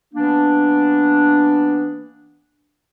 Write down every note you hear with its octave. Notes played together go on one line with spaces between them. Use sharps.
E3 A#3 B3 D4